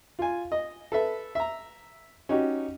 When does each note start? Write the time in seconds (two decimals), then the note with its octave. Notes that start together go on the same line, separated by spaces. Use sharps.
0.19 F4 G#5
0.52 D#5
0.92 A4 B4 E5
1.35 E5 A#5
2.29 C#4 D#4 F#4 G4